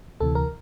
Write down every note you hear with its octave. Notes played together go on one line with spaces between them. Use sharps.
D2 C3 E3 A4
A#4